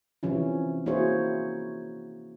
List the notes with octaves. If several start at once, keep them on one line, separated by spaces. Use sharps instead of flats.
C3 E3 F3 C#4 E4
A#3 E4 F#4 G#4 C5 C#5